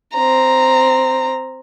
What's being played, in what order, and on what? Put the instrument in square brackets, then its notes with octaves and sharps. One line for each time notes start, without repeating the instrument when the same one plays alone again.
[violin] C4 A#5